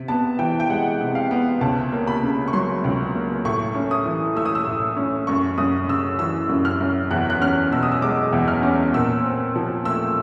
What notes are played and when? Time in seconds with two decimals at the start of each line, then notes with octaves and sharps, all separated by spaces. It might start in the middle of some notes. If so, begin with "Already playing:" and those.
Already playing: C3
0.08 B3 A5
0.39 E3 G5
0.60 G5
0.69 G#3 F#5
1.01 C3
1.15 F5
1.31 B3
1.61 C#2 A5
1.92 A#3
2.07 B5
2.23 C#3
2.48 C#6
2.53 F#3 C6
2.84 C#2
3.15 A#3
3.45 A2 C#6
3.75 C#4
3.91 D#6
4.05 E3
4.36 A3 E6
4.45 D#6
4.55 E6
4.67 A2
4.97 C#4
5.27 F#2 C#6
5.58 F#2 D#6
5.88 C#3 E6
6.19 E3 E6
6.49 F#2
6.65 F6
6.81 F#2
7.11 E2 F#6
7.30 F#6
7.41 C#4 F6
7.71 B2 E6
7.83 D#6
7.92 E6
8.02 G#3 D6
8.33 E2
8.48 F6
8.63 C#4
8.94 A#2 E6
9.24 C4
9.56 F3
9.85 A3 E6